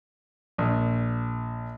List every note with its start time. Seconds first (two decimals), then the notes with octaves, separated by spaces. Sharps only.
0.58 A#1